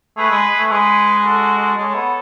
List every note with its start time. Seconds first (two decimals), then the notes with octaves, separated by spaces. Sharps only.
0.17 A3 G#4 B4
0.31 G#3
0.58 A3
0.70 G#3 G#4 B4
1.24 F#4 A4
1.77 G#3 A4 C#5
1.95 B3